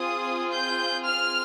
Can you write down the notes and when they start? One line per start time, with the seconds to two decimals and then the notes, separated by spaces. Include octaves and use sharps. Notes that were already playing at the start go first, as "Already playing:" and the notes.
Already playing: C4 F4 G#4 D#6
0.53 G6
1.04 F6